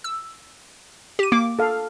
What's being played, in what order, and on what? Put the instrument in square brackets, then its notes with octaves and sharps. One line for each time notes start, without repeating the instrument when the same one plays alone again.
[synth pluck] E6
G4 D#7
[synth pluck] A#3 [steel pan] D6
[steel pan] A4 F5